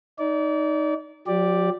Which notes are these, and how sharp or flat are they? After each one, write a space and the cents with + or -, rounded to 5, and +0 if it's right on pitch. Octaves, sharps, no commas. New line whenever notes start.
D#4 +0 D5 -30
F#3 -45 G4 +0 D5 +0